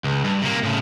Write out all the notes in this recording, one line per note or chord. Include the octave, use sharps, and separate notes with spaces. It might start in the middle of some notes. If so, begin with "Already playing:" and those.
C#2
G2
C3 A#3
A2 C#3